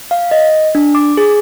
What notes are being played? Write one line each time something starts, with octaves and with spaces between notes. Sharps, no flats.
F5
D#5
D4
D6
G#4